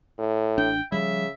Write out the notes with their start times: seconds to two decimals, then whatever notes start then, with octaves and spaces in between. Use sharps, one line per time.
0.19 A2
0.58 A1 D4 G5
0.92 C#3 F3 G3 E5